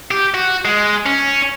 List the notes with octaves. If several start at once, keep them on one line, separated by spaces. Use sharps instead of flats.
G4
F#4
G#3
C#4